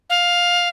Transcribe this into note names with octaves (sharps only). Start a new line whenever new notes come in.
F5